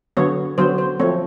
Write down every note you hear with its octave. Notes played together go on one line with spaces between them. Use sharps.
D3 F#3 B3 C#5
D3 F#3 B3 C5
C5
F3 A3 C4 C#5